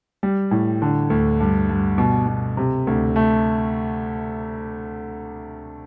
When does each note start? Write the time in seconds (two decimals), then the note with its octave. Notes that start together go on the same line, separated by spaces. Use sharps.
0.23 G3
0.51 A2
0.82 D3
1.10 D2
1.40 G2
1.69 G2
1.98 B2
2.27 B2
2.57 C3
2.87 D2
3.16 A3